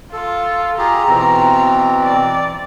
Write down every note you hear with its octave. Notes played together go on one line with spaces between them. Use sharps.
F4 A4
F4 G4 G#4 A#5
B2 E3 C4
D5